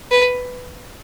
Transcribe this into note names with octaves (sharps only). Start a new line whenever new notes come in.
B4